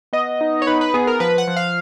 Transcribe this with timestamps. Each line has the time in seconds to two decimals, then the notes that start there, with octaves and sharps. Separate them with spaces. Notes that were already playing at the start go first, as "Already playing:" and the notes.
0.13 B3 D#5
0.41 D#4
0.62 C#5
0.67 D#4 B4
0.81 B4
0.94 B3 G#4
1.07 A#4
1.20 F3 B4
1.38 F#5
1.48 F3
1.56 F5